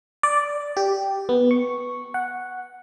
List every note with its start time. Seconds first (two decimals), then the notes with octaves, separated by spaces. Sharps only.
0.23 D5
0.77 G4
1.29 B3
1.51 C#6
2.14 F#5